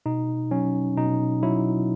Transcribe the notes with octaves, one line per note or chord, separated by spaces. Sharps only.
B2 D#4
F#3 C#4
B2 D#4
F#3 E4